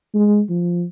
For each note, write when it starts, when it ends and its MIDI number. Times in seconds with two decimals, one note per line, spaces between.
0.15 0.41 56
0.50 0.85 53